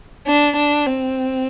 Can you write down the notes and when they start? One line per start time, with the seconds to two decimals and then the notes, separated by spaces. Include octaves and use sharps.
0.26 D4
0.56 D4
0.86 C4